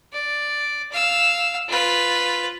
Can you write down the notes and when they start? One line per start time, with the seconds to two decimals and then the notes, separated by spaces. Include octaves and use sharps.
0.13 D5
0.92 F5 E6
1.68 F4 B4